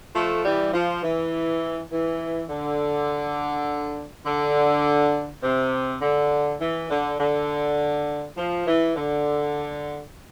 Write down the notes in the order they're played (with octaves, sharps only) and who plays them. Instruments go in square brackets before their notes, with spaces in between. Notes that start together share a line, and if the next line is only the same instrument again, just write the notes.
[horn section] F3 A3
E3 G3
F3
E3
E3
D3
D3
C3
D3
E3
D3
D3
F3
E3
D3